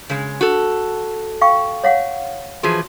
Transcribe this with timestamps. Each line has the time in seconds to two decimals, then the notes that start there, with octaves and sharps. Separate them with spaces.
0.09 C#3 G#3
0.41 F#4 A4
1.41 F5 G5 C#6
1.84 C#5 F5 F#5
2.63 E3 F3 F#4 G#4